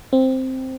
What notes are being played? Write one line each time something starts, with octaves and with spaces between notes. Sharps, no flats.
C4